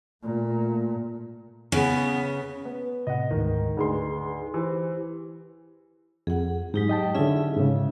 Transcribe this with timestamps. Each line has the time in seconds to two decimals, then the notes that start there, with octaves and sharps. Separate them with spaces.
0.23 A#2 A3
1.72 C#3 B3
2.65 B3
3.07 A2 C3 D#5 F#5
3.31 D2 G#2 D#3
3.77 D2 D#4 G#4 B4 C6
4.54 E3 G4 C5
6.27 F2 G#4 F#5
6.74 G#2 F#3 D#4 G4
6.89 D#5 G5 A5
7.15 D3 C#4 E4 G#4 E5
7.56 G#2 C#3